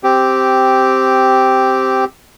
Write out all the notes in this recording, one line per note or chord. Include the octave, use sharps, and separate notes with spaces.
C4 G4